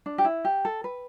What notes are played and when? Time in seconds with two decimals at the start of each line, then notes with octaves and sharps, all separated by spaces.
0.06 D4
0.18 G4
0.24 E4
0.45 G4
0.65 A4
0.84 B4